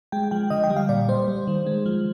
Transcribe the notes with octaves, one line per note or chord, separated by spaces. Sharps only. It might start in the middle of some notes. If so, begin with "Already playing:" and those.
G#3 G5
F3 G5
D3 D#5
G5
G3
F5
A#2 D5
G3 C5
G3
D#3
G#3
F3